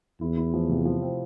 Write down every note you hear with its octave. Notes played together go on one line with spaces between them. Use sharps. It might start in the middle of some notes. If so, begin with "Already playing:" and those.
E2 E4
E4
F3
C3
F3
C4